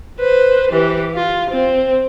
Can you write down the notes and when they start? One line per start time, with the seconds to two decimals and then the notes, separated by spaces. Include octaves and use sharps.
0.19 B4 C5
0.71 E3 G4
1.14 F4
1.50 C4